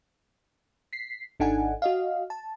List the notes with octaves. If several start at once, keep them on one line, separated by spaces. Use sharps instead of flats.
B6 C7
G#1 D4 D#4 A4 F#5 G#5
F#4 D#5 F5
A5